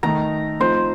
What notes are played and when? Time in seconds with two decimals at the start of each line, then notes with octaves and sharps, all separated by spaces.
0.03 D#3 A3 D#4 A#5
0.60 F3 A3 C4 D#4 C5